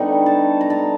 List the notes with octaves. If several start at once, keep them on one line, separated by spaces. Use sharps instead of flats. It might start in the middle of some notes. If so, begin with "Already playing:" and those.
Already playing: D3 G3 B3 D#4 C#6
A5
A#5
A5